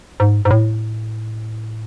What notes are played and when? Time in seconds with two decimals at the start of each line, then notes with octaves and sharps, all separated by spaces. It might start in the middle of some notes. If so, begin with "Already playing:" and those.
0.20 G#2
0.45 G#2
0.51 A2